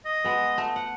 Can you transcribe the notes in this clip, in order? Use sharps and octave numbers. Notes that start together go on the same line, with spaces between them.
D#5
G#3 B3
A3
F#5